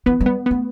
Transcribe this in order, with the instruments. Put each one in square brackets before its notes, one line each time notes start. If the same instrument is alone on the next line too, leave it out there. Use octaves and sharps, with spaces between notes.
[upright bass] E3 [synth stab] B3
[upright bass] G3
[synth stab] B3
[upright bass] A3 [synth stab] B3